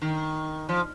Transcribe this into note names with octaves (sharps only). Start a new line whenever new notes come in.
D#3
F3